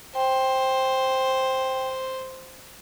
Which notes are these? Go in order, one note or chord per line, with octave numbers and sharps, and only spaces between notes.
C5 G5